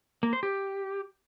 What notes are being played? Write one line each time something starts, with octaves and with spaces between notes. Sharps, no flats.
A#3
C5
G4